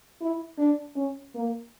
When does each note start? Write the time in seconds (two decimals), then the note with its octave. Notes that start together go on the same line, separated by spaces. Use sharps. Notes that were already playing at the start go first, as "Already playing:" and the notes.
0.21 E4
0.58 D4
0.96 C#4
1.35 A#3